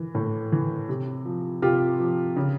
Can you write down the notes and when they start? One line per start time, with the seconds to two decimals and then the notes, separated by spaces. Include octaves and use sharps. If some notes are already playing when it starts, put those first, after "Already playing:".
Already playing: E3
0.15 A2
0.52 E3
0.89 C3
1.25 F3
1.62 C3 F4 G4
2.00 F3
2.36 C#3